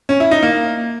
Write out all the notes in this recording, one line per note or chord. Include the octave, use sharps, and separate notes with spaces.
C#4
E4
D#4
A#3